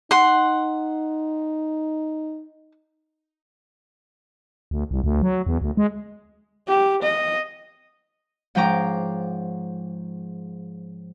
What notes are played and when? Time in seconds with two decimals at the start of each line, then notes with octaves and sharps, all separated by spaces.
0.11 D#4 F#5 C6
4.71 D2
4.91 C2
5.04 D2
5.22 F#3
5.47 E2
5.62 D2
5.77 G#3
6.68 G4
7.02 D#5
8.55 G#2 F3 C#4 G5 A#5 D6